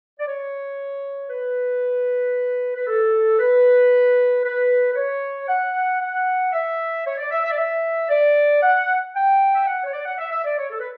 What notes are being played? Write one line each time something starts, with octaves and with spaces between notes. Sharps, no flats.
D5
C#5
B4
B4
A4
B4
B4
B4
C#5
F#5
F#5
E5
C#5
D5
E5
E5
D5
E5
D5
F#5
G5
E5
F#5
C#5
D5
F#5
E5
E5
D5
C#5
A4
B4